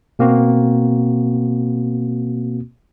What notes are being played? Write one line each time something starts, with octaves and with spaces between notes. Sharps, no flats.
B2 A#3 C4 F#4